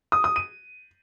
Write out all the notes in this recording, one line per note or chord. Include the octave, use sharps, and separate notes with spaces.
D#6
D#6
D#7